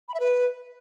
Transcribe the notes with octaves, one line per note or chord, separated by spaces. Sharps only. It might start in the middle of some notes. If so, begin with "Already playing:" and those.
B5
E5
B4